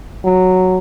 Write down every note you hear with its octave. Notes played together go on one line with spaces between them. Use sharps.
F#3